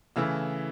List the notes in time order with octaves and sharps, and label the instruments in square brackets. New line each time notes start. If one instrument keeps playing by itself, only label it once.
[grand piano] C#3 E3 A3 E4 E6